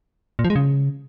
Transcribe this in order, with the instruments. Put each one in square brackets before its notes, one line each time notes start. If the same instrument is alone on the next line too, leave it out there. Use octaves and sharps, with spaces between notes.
[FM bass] A#2
F3
G#3
C#3